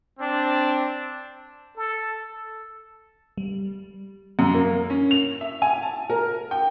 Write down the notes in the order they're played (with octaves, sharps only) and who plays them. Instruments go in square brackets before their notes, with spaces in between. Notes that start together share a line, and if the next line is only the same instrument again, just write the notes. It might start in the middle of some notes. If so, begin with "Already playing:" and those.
[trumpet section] C4 D4
[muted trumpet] A4
[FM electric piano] G3
[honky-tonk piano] F#2
A#3
C#4
F7
E5
G#5
A5
A#4
G5